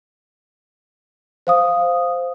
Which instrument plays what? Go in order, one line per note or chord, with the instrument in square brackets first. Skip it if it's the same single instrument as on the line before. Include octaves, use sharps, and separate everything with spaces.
[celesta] C5 F5 D#6